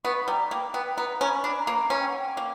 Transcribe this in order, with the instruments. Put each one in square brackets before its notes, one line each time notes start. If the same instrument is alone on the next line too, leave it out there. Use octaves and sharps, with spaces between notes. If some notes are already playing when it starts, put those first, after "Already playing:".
[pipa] B3 [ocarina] C#6
[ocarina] B5
[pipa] G3 [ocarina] A#5
[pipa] A#3 [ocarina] G5
[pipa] B3 [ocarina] G5
[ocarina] G5
[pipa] B3 [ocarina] A#5
[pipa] C#4
[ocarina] B5
[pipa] D4
[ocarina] A#5
[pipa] A#3 [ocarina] B5
[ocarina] A#5
[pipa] C#4 [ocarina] A#5
[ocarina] G5
F#5
G5
[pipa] A#3